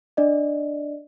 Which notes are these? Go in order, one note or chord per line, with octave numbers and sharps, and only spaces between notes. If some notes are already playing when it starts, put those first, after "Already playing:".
D4 D5 D#5